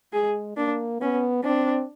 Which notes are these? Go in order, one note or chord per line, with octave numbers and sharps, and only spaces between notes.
G#3 G#4
A#3 D4
B3 C#4
C4 D4